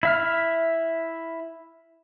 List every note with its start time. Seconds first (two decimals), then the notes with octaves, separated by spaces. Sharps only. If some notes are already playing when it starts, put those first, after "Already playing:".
0.03 E4 E5 F6